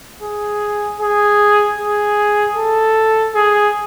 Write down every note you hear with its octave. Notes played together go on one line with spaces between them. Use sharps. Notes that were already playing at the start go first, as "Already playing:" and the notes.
G#4
G#4
G#4
A4
G#4